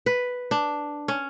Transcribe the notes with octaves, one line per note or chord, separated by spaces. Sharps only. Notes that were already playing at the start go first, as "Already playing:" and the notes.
B4
D4
C#4